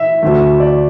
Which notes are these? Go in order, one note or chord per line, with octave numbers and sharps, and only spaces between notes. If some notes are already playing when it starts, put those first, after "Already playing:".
Already playing: E5
D2 D3 A3
D5